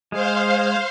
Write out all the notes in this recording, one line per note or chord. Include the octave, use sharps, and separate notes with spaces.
G#3 C5 F5